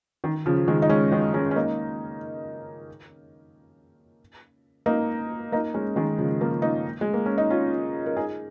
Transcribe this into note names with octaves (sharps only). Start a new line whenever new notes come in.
D#3
C#3 F3
D#3 G#3
D#4
G#3 C#4
D#3 G#3
G#3 C#4
C#4
A#3 D#4
A#3 D#4
A#3 D#4
G#3 C#4
D#3 G#3
C#3 F3
F3 A#3
A#3 D#4
G#3
A#3
C#4
D#4
C#4 F4
A#4
D#4 G#4